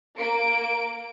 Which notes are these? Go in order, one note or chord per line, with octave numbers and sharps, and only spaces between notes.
A#3 D7